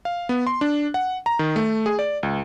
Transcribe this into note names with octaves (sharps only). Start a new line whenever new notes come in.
F5
B3
C6
D4
F#5
A#5
D#3
A3
G#4
D5
C#2